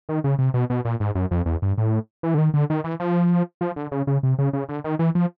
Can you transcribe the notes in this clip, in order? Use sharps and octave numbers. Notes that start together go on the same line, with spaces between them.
D#3
C#3
C3
B2
B2
A#2
G#2
F#2
F2
E2
G2
A2
E3
D3
D#3
D3
D#3
E3
F3
F3
D3
C#3
C#3
C3
C#3
C#3
D3
D#3
E3
F3